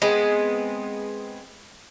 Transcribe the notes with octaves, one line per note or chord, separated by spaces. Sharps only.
G#3 B3 C4